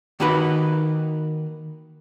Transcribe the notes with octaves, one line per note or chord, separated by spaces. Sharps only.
D#3 A#3 D#4 F#4 B4 B5